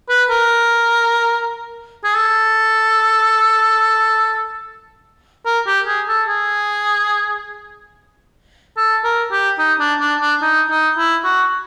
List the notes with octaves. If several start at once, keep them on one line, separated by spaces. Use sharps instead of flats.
B4
A#4
G#4
A4
A#4
G4
G#4
A4
G#4
A4
A#4
G4
D#4
D4
D4
D4
D#4
D#4
E4
F#4